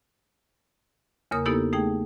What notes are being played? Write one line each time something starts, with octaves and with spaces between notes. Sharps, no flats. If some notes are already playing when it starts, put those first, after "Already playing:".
E2 C#3 A#3 A#4 D#6
A#3 B3 D#4 E4 G4 A4
A3 D#4 G#4 G5